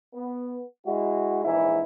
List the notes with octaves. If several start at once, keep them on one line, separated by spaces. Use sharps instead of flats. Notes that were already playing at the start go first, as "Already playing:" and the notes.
B3
G#3 E4 F#4
A#1 G#2 E3 E4